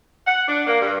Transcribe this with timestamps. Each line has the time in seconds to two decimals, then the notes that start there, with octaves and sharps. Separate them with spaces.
0.27 F#5
0.48 D4
0.67 A#3
0.81 G2